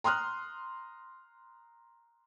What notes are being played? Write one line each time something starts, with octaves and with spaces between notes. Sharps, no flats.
A#5 C6 D#6 F6 F#6